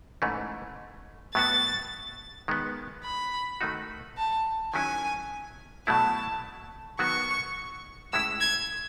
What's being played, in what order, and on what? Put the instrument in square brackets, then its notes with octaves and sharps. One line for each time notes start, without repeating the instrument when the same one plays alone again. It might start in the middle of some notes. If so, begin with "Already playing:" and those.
[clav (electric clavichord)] G#2 E3 A3 C#4
[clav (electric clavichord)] A2 F#3 B3 F#4 [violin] A6
[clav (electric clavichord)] D#3 G#3 B3
[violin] B5
[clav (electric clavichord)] D#3 A3 D#4 F#4
[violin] A5
[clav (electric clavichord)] D#3 F#3 C#4 E4 [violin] G#5
[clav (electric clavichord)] B2 F#3 A3 E4 [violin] A5
[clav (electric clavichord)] D#3 F#3 B3 F#4 [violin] C#6
[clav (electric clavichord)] A2 G#3 C#4 E4 [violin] E6
[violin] G#6